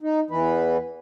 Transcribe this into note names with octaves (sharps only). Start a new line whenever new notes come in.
D#4
E2 E3 B4